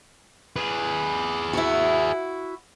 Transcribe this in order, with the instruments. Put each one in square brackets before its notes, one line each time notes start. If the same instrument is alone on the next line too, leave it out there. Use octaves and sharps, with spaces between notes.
[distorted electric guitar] G#4 B4
[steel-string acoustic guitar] E4 F#4